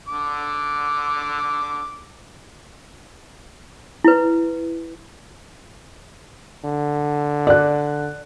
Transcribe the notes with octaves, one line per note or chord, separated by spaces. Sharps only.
D3 D6
E4 B4
D3
D5 F#6